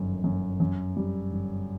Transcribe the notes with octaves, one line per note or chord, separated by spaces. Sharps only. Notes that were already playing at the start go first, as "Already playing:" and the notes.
Already playing: G1 F#2 D#3
F#2
F#2
G3
G1